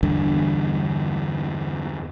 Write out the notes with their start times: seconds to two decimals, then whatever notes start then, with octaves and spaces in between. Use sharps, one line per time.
0.03 E2 G2 D3